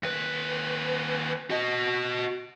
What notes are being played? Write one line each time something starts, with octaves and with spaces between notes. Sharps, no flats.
D#2 B4
F#4 D#5